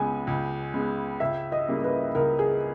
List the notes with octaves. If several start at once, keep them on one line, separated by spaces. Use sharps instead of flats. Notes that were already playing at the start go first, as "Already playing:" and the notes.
Already playing: C#2 C#3 G#3 B3 G#5
C#2
C#3 G#3 B3
C#2 E5
D#5
C#3 G3 A#3 E4
B4
C#2 A#4
G#4